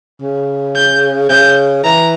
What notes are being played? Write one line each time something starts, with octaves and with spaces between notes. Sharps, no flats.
C#3
G6
C#3 G6
E3 A#5